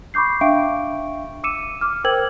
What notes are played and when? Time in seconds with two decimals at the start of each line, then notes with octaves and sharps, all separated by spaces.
0.14 B5 C#6 D6 G6 C7
0.41 D4 E5 F5 G5 C#6 D7
1.44 D6 E6 C#7 D#7 E7
1.81 D6 F6
2.04 A#4 C5 G5 E6 G#6 F#7